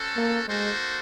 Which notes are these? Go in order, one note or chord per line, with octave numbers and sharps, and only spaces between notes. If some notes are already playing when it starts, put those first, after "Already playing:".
Already playing: C#4 F#4 A4 C5
A#3
G#3 A#3 D#4 F#4 A4 C5